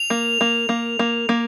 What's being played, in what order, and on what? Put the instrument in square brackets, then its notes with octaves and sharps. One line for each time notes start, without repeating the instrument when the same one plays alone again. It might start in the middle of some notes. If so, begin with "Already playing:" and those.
Already playing: [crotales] F7
[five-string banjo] A#3
A#3
A#3
A#3
A#3